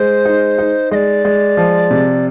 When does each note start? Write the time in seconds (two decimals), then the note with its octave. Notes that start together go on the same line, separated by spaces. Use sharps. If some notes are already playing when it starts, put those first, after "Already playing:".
Already playing: G#3 C5
0.25 D#4
0.58 D#4
0.91 G#3 D#5
0.95 D5
1.25 G#3
1.57 F3
1.91 C3